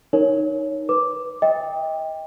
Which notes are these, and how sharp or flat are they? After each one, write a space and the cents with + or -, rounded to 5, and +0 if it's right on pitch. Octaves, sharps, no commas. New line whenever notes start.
D#4 +0 A#4 +0 C#5 +0
B4 +0 D6 +0
D#5 +25 G5 +20